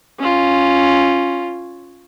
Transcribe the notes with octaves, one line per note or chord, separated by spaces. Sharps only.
C#4 F4